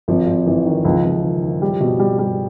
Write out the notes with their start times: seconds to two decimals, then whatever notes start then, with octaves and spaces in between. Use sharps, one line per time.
0.08 G#1 F3
0.26 G#1
0.46 G#1 E3
0.66 D#3
0.85 C#2 F3
1.04 C#2
1.23 D#3
1.42 D#3
1.62 G3
1.80 B2
2.00 G3
2.19 G3